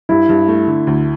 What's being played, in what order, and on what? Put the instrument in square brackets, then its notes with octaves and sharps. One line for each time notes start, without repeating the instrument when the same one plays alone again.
[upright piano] G2 [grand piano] E4
[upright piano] G2
A3
D3
D2